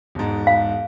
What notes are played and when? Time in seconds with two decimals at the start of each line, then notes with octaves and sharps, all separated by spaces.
0.15 E1 G#2
0.47 F5